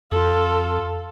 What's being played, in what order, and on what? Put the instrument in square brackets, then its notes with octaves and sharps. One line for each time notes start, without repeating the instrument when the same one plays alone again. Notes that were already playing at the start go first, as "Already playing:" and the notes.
[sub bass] F2 [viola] F4 A4